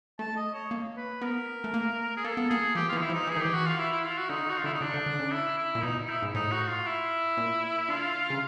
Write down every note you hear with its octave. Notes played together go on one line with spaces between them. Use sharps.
A3 A5
D#5
C#5
A#3
B4
B3 A#4
A3
A#3
G#4
A#3 A4
B3
A#3 G#4
F3 G4
E3 F4
D#4
E4
F3
D#4
E3 G#4
D#3
E3 G4
F#4
F4
E4
E4
F4
F#4
D3 D#4
D#3
F#4
F4
D3 E4
D#4
C#3 D4
D3
D3
C#3
E4
E4
A#2
B2 D#4
D#4
E4
G#2
A2 D#4
F#4
F4
E4
A#2
D3 F4
C#3